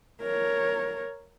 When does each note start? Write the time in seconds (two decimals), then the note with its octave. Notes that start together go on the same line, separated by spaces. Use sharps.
0.22 A#4 C#5